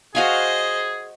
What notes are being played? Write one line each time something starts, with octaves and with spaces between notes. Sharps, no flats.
F#4 G#4 C5 D#5 F5 G#5